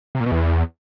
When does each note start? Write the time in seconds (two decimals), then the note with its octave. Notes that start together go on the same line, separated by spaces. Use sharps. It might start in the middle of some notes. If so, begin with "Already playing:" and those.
0.15 C3
0.20 A#2
0.26 B2
0.32 E2